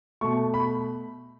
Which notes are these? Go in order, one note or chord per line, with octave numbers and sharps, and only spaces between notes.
B2 A3 C#6
B5